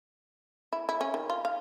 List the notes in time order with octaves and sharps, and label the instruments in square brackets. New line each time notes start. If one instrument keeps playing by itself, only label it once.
[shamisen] E4
E4
C#4
D#3
F4
F5